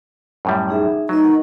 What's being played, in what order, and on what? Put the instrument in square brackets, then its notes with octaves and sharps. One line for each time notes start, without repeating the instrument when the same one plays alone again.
[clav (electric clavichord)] F#2 A2 G3
[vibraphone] D#4 G#4 E5
[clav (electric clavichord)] F#3 [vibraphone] A3 B4 D#5 [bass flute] D#4
[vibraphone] A#4 F#5 C#6